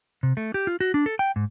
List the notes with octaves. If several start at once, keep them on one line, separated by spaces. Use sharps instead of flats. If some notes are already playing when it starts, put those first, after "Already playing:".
C3
A3
G4
F4
F#4
D4
A4
G5
G#2